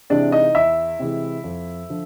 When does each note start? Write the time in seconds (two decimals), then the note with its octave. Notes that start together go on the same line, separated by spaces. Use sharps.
0.10 C3 E3 G#3 D4 D5
0.32 D#4 D#5
0.55 E2 E4 E5
0.99 C3 E3 G#3
1.44 F2
1.90 D3 F3